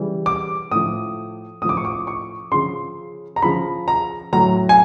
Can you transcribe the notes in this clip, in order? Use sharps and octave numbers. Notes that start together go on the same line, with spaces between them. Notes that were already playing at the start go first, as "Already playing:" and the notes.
Already playing: C#3 E3 G3
D6
A2 F3 D#6
A2 F3 D6 D#6
C#6
D6
C#6
C#3 F3 C6
A#5
C#3 F3 B5
A#5
A2 F#3 A#5
G#5